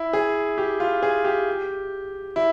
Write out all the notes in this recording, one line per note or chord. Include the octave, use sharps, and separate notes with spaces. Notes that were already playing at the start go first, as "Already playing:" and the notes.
Already playing: E4
G#4
G4
F4
G#4
G4
E4